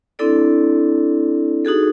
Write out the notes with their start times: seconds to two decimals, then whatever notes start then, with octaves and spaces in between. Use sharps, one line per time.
0.19 C4 D4 E4 A4 D5
1.65 D#4 F#4 G#4 A4